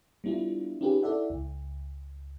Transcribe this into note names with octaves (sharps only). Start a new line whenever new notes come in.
G3 B3 D4 E4 F4
C#4 D#4 F4 G4 G#4 B4
E4 A4 D5 E5 F#5
C#2